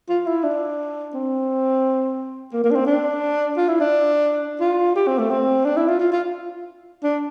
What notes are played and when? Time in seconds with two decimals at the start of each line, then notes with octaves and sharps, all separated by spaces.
0.09 F4
0.27 E4
0.44 D4
1.14 C4
2.53 A#3
2.64 A#3
2.71 D4
2.75 C4
2.87 D4
3.57 F4
3.68 E4
3.80 D4
4.61 F4
4.95 G4
5.07 C4
5.18 A3
5.31 C4
5.65 D4
5.77 E4
5.88 F4
5.99 F4
6.12 F4
7.03 D4